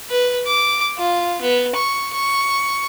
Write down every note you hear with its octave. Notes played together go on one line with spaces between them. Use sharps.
B4
D6
F4
B3
C#6
C#6